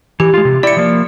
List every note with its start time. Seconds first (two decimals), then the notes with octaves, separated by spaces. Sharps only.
0.20 E3 G4
0.34 G#3 F4
0.45 C3
0.63 E4 G4 D5 C#7
0.77 F3 A#3